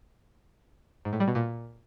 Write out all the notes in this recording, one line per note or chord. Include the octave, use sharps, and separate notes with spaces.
G#2
A2
G3
B2
A#2